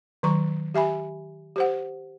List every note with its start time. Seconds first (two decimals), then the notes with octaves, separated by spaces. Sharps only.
0.23 D#3 F#3 A#5 C#6
0.74 G4 E5 G#5 B5
1.56 G4 C5 F#5